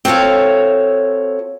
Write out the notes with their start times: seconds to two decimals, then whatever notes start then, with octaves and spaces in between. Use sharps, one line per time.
0.05 C4 F#4 A4 C#5 F5